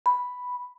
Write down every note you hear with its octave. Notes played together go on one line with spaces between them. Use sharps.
B5